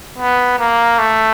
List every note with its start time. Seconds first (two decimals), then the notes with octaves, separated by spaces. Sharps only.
0.18 B3
0.59 A#3
0.99 A3